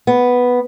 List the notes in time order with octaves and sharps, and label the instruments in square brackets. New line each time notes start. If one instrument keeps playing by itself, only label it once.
[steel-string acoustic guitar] B3